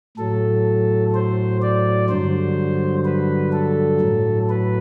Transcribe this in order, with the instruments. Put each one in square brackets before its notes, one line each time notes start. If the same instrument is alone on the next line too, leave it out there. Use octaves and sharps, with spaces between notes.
[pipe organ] A2 F#3 A4
C5
D5
G2 D3 F#3 C5
B4
A4
A2 F#3
B4